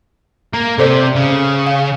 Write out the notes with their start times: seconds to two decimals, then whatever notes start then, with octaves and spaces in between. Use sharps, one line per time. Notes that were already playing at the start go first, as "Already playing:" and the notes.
0.54 A#3
0.78 C3 G4 A4 C5 D5
1.15 C#3
1.67 F5